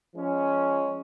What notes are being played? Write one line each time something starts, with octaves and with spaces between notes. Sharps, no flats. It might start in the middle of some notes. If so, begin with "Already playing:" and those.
F3 G#3 C#4